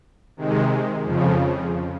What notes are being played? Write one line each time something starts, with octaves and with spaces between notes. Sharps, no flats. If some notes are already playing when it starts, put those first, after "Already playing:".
C3 D#3 G#3
F2 C#3 F3